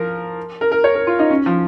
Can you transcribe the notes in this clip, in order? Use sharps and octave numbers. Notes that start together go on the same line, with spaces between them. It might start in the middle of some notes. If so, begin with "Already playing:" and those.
Already playing: F3 A#4
A#4
A#4
C#5
A#4
F4
D#4
C#4
F3